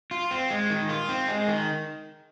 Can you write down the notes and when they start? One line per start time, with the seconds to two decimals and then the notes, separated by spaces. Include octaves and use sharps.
0.11 F4
0.31 C4
0.51 G#3
0.70 D#3
0.89 F4
1.09 C4
1.28 G#3
1.48 D#3